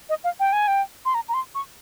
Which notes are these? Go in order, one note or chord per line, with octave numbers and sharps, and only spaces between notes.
D#5
F5
G5
G#5
G5
C6
A#5
A#5
C6
C#6